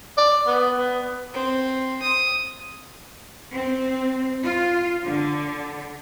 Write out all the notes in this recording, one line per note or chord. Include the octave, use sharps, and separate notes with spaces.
D5
B3
B3
C4
D#6
C4
F4
D3